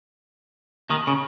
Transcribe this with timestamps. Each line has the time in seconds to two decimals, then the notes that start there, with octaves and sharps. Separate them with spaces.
0.90 D#2 D#3
1.07 C#3